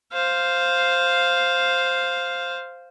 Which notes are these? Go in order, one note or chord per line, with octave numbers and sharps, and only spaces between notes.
C5 F5